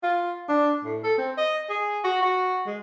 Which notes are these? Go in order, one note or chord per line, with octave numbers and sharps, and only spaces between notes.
F4
D4
A2
A4
C4
D#5
G#4
F#4
F#4
G#3